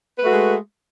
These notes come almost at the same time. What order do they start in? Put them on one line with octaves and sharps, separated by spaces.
B4 A3 F#4 G#3